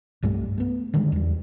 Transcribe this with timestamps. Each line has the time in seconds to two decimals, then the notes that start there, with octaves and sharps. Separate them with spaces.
0.22 C2 G2 G3 A3
0.58 A3 B3
0.94 D3 D#3 G3 G#3
1.12 E2 G3